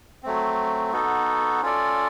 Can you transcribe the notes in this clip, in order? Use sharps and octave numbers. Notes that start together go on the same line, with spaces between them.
F#3 A3 C4
B3 D#4 F#4 A4
C#4 F4 A4 D5